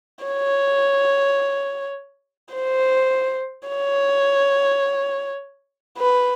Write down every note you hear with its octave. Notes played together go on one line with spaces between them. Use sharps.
C#5
C5
C#5
B4